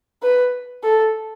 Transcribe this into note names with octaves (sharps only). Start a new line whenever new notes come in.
B4
A4